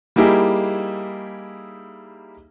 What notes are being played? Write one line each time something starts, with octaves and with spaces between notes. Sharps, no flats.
G3 A#3 D#4 E4 G4 G#4